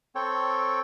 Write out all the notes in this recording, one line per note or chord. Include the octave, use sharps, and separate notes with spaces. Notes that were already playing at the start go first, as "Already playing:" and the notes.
C4 A4 C#5 G5